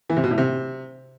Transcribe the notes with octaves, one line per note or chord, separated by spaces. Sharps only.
E3
C3
B2
A2
C3